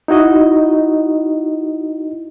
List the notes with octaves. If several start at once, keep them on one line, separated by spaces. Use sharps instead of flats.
D#4 E4 F#4 D#5